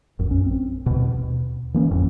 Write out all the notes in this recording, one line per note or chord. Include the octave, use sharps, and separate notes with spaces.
A#1 F#2
C#4
C4
D#2 B2
E3 A#3 C#4
A1 F2